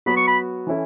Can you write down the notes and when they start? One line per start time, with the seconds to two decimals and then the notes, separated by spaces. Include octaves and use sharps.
0.06 F#3 B3 F#4 B5
0.17 C#6
0.27 B5
0.67 E3 C#4 E4 A4